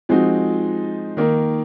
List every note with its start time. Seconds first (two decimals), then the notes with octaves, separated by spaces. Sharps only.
0.09 F3 G#3 C4 D#4 F#4
1.17 D#3 A#3 D#4 A#4